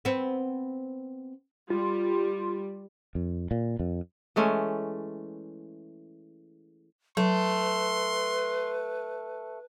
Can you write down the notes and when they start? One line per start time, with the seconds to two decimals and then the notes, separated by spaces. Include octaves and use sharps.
0.05 B3 C4
1.70 G3 F4
3.15 F2
3.51 A#2
3.80 F2
4.36 E3 G#3 A3 C#4
7.17 F#3 A3 B4 C6